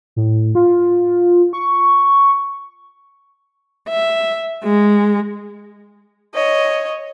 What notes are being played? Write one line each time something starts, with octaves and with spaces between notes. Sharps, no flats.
A2
F4
C#6
E5
G#3
C#5 D#5